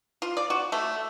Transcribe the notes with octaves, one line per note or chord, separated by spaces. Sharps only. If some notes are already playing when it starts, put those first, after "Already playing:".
F4
D5
F#4
A3